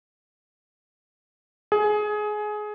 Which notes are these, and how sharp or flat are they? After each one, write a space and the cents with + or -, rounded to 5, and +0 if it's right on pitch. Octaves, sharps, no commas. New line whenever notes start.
G#4 +20